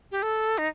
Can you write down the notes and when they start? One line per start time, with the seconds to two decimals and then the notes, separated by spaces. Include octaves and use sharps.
0.11 G4
0.23 A4
0.58 D#4